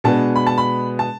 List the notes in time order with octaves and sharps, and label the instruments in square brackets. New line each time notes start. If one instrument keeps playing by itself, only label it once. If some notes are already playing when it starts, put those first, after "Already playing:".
[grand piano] B2 G#3 B3 D4 A5
B5
A5
B5
A5